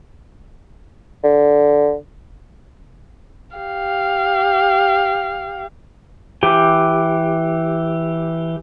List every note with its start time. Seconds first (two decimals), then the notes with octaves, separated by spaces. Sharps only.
1.24 D3
3.56 G4 F5
6.43 E3 G4